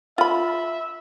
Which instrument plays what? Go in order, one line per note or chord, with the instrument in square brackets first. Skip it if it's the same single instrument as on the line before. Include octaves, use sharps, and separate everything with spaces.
[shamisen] F4 B5 [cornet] E5